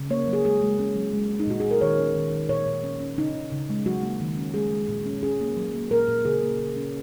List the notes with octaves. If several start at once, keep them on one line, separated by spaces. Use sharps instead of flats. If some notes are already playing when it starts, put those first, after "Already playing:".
Already playing: C#3
A#3 C#5
F#3
G#4
G#3 G#4
G#3
C#4
F#3
G#3
G#3
D#4
A#2 F#4
A#2 G#4
A#4
D#3 C#5
C#4
D#3
D#3
A#2 C#5
A#2
C#4
C#4
C#3 D#4
C#3
C#3
G#3
F#3 F#4
A#3
D#3
C#4
G#3 G#4
G#3
A#2
C#4
C#4 G#4
A#3
F#3
A#3
A#2 A#4
A#2
C#3 G#4
A#3
C#3
C#4